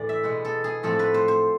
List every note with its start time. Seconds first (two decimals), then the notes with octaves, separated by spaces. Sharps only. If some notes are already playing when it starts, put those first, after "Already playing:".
Already playing: A2 E3 D5
0.09 E5
0.23 B2 G#3 B3
0.45 A4
0.64 G#4
0.83 A2 F3 A3 C4 A4
0.99 B4
1.14 C5
1.28 C5